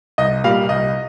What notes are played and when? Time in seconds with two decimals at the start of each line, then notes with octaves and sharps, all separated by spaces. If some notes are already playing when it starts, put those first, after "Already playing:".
0.18 C2 D#5
0.44 A#2 G3 A#3 F5
0.69 C2 D#5